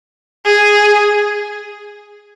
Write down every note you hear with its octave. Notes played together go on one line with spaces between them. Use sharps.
G#4